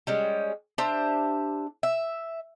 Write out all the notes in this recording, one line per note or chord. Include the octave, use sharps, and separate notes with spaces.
G3 G#3 C#4
D4 G4 C5 E5
E5